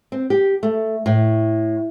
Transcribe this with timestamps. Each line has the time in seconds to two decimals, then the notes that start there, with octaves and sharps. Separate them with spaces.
0.12 C4
0.30 G4
0.63 A3
1.06 A2